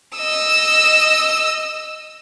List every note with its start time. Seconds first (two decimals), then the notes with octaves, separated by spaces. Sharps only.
0.17 D#5 E6